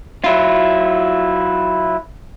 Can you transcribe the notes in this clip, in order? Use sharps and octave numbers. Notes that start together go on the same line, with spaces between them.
F#3 E4 F4